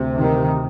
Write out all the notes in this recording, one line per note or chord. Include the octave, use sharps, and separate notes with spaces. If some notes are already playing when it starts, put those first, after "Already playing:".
Already playing: D2 C3
D#3